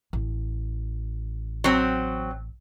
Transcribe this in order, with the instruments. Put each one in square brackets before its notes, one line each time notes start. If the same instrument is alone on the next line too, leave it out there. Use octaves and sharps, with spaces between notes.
[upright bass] A1
[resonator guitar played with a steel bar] F#3 C4